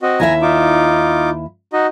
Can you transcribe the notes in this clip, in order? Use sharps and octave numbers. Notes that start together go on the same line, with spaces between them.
C4 F#4 D#5
D#2 E4 E5 G#5 A#5
D#4 F4 D6
D#4 F#4 D#5